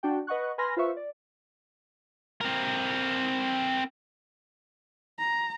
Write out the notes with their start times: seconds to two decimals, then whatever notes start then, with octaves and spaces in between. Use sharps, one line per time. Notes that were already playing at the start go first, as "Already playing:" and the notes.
0.03 D4 F#4 G5
0.27 B4 D#5 F#5 C#6 F#6
0.58 B4 G#5 B5 C6 F6 A#6
0.77 F4 B4 C5 E5 C#6
0.97 D5
2.41 C4 A#4
5.18 A#5